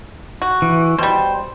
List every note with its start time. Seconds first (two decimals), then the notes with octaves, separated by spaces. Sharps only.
0.42 F#4
0.62 E3
0.99 B2 G3 C5 G5